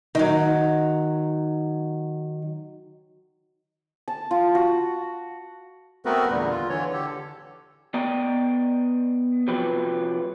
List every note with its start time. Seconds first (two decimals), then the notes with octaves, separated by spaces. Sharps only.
0.15 D#3 F#3
4.08 A5
4.31 F4
4.55 F#4
6.05 A3 B3 C4 F#4 A#4 B4
6.30 E2 A#2 D3 G3
6.50 F4
6.69 D3 E3 C#5
6.93 D3 G4 A4
7.94 B3 D5 D#5 G5 A#5
9.48 C3 F3 F#3 G4 B4